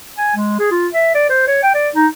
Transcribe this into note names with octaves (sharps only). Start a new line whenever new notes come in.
G#5
G#3
G#4
F4
E5
D5
C5
C#5
G5
D5
D#4